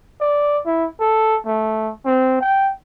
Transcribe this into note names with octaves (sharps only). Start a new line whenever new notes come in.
D5
E4
A4
A3
C4
G5